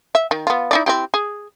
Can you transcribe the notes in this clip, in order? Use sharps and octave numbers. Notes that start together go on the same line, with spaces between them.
E5
D#3
B3 F4
D#4 E4 D5
C4 E4 G4
G#4